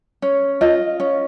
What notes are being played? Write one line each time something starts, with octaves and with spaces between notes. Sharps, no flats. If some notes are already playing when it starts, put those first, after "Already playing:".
C#4
F4 D#5
C#4